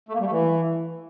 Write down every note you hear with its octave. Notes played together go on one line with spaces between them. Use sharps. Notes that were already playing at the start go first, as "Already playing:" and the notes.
A3
A#3
G3
A3
E3